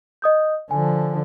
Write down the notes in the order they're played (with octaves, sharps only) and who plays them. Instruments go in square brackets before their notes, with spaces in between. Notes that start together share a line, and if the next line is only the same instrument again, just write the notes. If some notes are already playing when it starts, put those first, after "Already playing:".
[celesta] D#5 D#6 G6
[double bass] D3 F3 [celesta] G#5